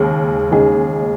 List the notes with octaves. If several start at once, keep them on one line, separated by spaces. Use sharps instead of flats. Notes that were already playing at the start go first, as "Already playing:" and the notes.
Already playing: D#2 C#3 G#3 G#4
D#2 C#3 G#3 D#4 G#4